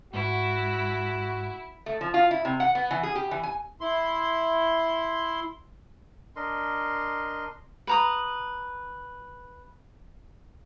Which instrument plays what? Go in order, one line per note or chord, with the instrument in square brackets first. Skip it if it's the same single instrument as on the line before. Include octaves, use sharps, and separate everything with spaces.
[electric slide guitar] G#2 [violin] E4 [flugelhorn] F#4
[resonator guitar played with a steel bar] A3
F3
F4
E4
C3
F#5
B3
E3
G#4
G4
E3
G#5
[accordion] E4 C6
[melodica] D4 A#4 D#5 C6
[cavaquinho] B4 A#5 D#6